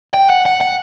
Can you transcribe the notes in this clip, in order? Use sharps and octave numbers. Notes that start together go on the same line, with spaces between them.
G5
F#5
F#5
F#5